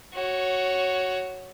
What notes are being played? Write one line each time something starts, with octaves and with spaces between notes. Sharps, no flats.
F#4 C#5